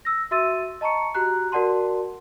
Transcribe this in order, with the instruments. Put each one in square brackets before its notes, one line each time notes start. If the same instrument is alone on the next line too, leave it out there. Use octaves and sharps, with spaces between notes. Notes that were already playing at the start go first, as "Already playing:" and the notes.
[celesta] E6 A#6
F#4 E5 C6 E6 A6 D#7
D#5 A5 A#5 C#6 C#7
F#4 G4 A#5 F#6
F#4 A#4 D5 F#5 A5 C6